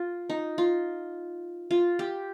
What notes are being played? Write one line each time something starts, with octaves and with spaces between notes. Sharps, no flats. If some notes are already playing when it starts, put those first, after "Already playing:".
Already playing: F4
D#4
F4
F4
G4